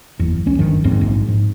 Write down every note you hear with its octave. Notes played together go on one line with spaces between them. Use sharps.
F#1 E2
C#2 C#4
G1 G2 D#3 F3
D1 D#2 G#2 C4
A#1 G#2
G#2